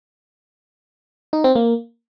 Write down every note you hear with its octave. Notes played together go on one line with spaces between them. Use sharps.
D#4
C4
A#3